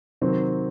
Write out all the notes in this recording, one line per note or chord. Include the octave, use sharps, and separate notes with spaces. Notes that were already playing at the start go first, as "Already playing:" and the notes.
C3 D#3 F#3 C4